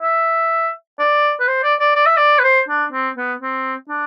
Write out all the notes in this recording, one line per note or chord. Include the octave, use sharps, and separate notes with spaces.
E5
D5
B4
C5
D5
D5
D5
E5
D5
B4
C5
D4
C4
B3
C4
D4